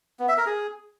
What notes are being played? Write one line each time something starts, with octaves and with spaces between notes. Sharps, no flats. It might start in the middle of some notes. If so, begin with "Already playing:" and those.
B3
E5
A#4
G#4